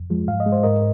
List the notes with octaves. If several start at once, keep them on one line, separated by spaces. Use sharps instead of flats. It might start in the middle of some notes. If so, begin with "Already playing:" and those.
Already playing: F2
F3 G#3
G#2 F5
D#5
G#3
C5
G#2 A#4 D#5